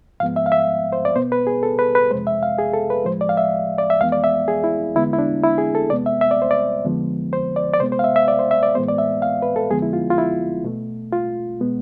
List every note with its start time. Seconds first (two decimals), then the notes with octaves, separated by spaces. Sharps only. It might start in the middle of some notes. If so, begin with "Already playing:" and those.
0.20 G#2 F3 G#3 B3 F5
0.36 E5
0.46 F5
0.52 E5
0.92 C5
1.05 D5
1.16 B2 B3 C5
1.32 B4
1.47 G#4
1.63 A4
1.79 B4
1.95 B4
2.11 F2 C3 G#3 C5
2.27 E5
2.43 F5
2.58 G#4
2.73 A4
2.90 B4
3.05 A2 F3 G#3 C5
3.21 D5
3.29 F5
3.37 E5
3.78 D5
3.90 E5
4.00 F2 E3 G#3 B3 F5
4.12 D5
4.24 E5
4.48 G#4
4.64 E4
4.95 E2 D3 G#3 B3 E4
5.13 E4
5.18 D4
5.43 E4
5.58 G#4
5.75 A4
5.90 E2 C3 G#3 B3 D5
6.06 E5
6.21 E5
6.31 D5
6.42 C5
6.51 D5
6.85 F2 D3 F3 G#3 B3
7.33 C5
7.56 D5
7.74 D5
7.80 C3 G#3 B3 C5
7.92 C5
7.99 F5
8.04 E5
8.16 E5
8.28 D5
8.39 C5
8.51 E5
8.63 D5
8.75 A2 E3 G#3 B3 C5
8.88 D5
8.98 E5
9.22 F5
9.42 B4
9.56 A4
9.70 F2 D3 F3 G#3 B3 G#4
9.82 E4
9.93 F4
10.10 F4
10.18 E4
10.64 B2 A3
11.12 F4
11.60 B2 G#3 B3